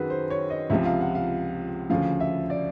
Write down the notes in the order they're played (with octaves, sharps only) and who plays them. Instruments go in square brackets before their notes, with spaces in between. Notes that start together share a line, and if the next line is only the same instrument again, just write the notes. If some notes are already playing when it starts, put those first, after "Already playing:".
Already playing: [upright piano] F#2 D#3 F#4 G#4 B4
C5
C#5
D#5
C#2 C3 F3 E5
F5
F#5
F5
D2 C#3 F3 F5
E5
D5